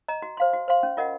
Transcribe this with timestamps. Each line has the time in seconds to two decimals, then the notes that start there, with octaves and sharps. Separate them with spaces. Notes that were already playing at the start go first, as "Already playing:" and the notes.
0.08 D#5 A#5
0.22 F#4
0.37 C5 F5 C6
0.53 F#4
0.68 C5 F5 C6
0.83 C#4
0.97 F4 A#4 D#5 F#5